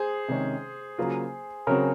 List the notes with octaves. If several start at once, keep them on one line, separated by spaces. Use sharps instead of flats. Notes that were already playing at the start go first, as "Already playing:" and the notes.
Already playing: G#4 C5
C3 D#3 G#3 C#4
C#3 F#3 A#3 F4
C#3 F#3 C4 A#4 C#5